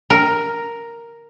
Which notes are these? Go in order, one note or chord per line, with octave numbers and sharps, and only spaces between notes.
A#4